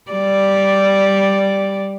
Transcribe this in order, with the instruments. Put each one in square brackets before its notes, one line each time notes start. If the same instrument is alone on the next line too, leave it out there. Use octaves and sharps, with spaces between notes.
[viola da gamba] G3 D5